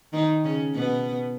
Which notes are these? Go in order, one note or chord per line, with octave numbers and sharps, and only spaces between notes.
D#3 D#4
C#3 C#4
B2 B3